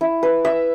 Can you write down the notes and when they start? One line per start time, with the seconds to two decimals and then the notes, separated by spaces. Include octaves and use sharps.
0.01 E4
0.23 B4
0.45 E5